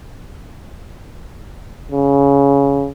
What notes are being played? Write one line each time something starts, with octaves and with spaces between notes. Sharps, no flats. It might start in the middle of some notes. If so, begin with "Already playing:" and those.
C#3